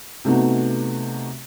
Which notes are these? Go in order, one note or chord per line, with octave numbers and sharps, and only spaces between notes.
C3 A3 B3 D#4 F#4